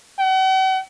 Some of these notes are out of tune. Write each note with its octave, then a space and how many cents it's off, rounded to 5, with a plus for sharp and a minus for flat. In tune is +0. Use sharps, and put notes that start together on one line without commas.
F#5 +45